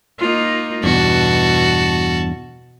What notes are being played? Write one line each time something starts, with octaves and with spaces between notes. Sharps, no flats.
A#3 D#4 F4
E2 G2 B2 F#4 A5